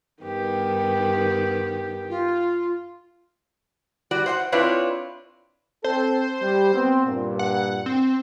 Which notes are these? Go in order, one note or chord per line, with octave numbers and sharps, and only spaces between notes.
G2 D#3 B3 G4
F4
G3 F#4 D5
C5 F5 F#5
C4 D4 E4 F4 B4 C#5
C4 A4 C5
G3
B3 C4
G2 A#2
F#5
C4